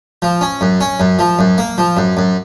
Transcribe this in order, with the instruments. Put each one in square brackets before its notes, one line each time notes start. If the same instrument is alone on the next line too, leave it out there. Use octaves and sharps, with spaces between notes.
[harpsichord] F3
C#4
F#2
C#4
F#2
F3
F#2
A#3
F3
F#2
F#2